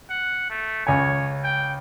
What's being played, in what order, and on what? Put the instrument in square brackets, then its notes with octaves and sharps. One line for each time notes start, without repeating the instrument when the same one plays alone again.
[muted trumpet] F#5
A3
[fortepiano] C#2 G#5 [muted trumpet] C#5
[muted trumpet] G5